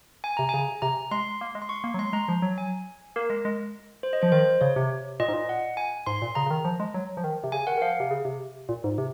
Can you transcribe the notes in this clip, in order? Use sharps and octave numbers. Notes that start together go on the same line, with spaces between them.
G#5
C3 A#5
C#3 G#5
C3 A#5
G#3 C6
A#3
G#3
C6
C#6
A#3
F#3
G#3 C6
G#3 A#5
F3
F#3
G#5
A#3 A#4
G#3
G#3
C5
D#5
F3 C5
D#3 C5
C#3 C#5
C3
A#2 D#5
G#2
A#2
F#5
G#5
G#2 C6
A#2
C#3 A#5
C#3
D#3
F3
G#3
F#3
F3
D#3
C3
C#3 G#5
D#3 F#5
D#3
F3 F5
C3
C#3
C3
A#2
G#2
C3